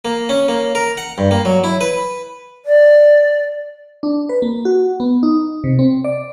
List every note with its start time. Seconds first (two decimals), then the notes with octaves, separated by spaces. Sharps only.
0.05 A#3
0.29 C#4
0.48 A#3
0.75 A#4
0.97 F#5
1.18 G2
1.31 A#3
1.45 F#3
1.64 E4
1.81 B4
2.65 D5
4.03 D4
4.29 B4
4.42 A#3
4.65 F#4
5.00 B3
5.23 D#4
5.64 C3
5.79 C4
6.04 D5